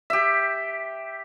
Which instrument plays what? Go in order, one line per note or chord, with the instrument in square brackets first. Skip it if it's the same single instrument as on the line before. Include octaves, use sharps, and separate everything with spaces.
[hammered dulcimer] G4 E5